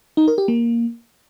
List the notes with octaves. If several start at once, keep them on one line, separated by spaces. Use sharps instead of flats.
D#4
A#4
G4
A#3